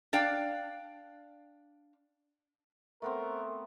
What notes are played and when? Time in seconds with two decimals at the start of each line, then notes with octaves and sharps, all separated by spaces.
0.13 D4 D5 F5 G5
3.02 A3 B3 C4 A#4